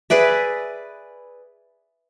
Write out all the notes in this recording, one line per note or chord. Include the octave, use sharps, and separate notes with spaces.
G#4 B4 D5 E5